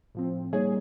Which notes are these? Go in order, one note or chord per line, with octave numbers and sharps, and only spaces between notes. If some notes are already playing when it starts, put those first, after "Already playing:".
A2 F3 C4
G3 A#3 D#4 G#4 C#5